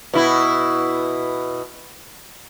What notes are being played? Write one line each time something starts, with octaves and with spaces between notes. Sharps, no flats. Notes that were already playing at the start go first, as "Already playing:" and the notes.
B2 E4